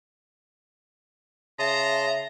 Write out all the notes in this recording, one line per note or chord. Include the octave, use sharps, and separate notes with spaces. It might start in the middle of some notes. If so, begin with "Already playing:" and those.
C#3 E5 A5 A#5 C6 D#6